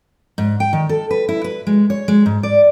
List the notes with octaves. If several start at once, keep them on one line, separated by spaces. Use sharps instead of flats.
G#2
G5
D#3
A4
B4
E4
B4
G#3
C#5
G#3
G#2
D5